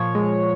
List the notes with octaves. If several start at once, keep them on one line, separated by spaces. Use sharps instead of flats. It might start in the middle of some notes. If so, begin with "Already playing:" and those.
Already playing: A#2 F3 C#5
G#3